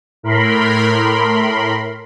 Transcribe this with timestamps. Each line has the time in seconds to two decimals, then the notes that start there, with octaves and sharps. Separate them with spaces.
0.23 A2 A#4 B5 C6